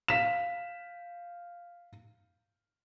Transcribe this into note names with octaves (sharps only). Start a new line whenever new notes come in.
F5 B6 E7